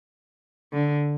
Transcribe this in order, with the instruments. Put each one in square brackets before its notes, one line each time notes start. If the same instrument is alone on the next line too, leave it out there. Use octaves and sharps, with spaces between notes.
[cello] D3